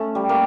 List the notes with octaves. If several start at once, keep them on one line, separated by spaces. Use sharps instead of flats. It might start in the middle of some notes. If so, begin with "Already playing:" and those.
Already playing: A3 C#4
G3
A#3